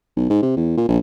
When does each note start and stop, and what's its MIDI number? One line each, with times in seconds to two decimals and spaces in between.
0.17 0.29 35
0.30 0.39 44
0.42 0.57 48
0.57 0.72 40
0.77 0.86 46
0.88 0.98 34